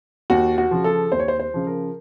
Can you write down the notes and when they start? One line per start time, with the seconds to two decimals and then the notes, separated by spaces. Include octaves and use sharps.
0.30 D#2 F#4
0.58 F#4
0.71 C#3 F3
0.84 A4
1.12 D#2 C5
1.20 C#5
1.28 C5
1.40 C5
1.54 C#3 F3
1.67 A#4